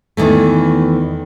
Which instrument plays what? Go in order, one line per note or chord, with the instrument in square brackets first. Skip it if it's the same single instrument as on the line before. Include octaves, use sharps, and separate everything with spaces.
[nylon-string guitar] E2 D#3 E3 A3